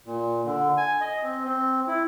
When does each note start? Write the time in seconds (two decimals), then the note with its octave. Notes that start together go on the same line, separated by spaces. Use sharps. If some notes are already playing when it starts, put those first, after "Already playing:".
0.06 A#2
0.46 D3
0.77 G#5
1.01 D#5
1.23 C4
1.45 C4
1.87 E4